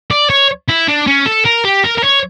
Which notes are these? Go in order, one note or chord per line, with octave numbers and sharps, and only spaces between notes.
D5
C#5
E4
D4
C#4
A4
A#4
G4
A#4
A#4
C#5